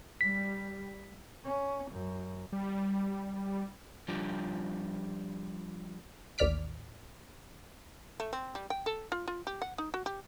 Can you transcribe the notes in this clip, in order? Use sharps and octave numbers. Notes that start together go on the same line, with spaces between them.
G3 B6
C#4
F#2
G3
F3 G3 D4 F4 G4
A1 D#2 D5 F6 B6 D7
A3
C4
G3
G5
A4
F4
F4
G4
F#5
D#4
F#4
G4